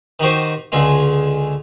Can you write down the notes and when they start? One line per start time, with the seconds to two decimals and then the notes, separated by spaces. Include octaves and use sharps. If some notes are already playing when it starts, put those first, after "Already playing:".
0.20 D#3 D#4 F#4 G4 C5
0.72 C#2 D3 G#3 F4